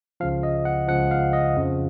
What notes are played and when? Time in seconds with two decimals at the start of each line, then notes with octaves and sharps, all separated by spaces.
0.20 C#2 C#3 F3 F5
0.43 D#5
0.65 F#5
0.88 C#2 C#3 F3 F#5
1.11 F5
1.33 D#5
1.55 F2 C#3 F3